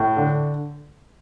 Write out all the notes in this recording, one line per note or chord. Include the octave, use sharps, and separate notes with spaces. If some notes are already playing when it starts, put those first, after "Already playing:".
Already playing: A2
D3